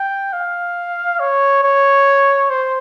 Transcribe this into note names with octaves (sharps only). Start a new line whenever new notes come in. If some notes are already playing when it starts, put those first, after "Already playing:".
Already playing: G5
F5
C#5
C#5
C5